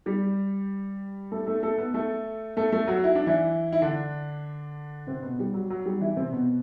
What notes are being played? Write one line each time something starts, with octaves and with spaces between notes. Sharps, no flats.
G3 G4
A3 A4
A3 A4
A3 A4
B3 B4
A3 A4
A3 A4
A3 A4
F#3 F#4
E4
D4
E3 E4
E4
D3 D4
C3 C4
B2 B3
G3
F#3
F#3
G3
E3 E4
C3 C4
B2 B3